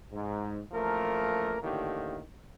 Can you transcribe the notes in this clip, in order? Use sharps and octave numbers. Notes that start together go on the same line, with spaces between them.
G#2
A1 F3 A3 A#3 A#4
A1 A2 D3 D#3 A#3 G4